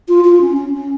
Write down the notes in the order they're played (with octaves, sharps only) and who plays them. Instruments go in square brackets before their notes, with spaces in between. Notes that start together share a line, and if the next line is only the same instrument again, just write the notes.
[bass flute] F4
F4
C#4
C#4
C#4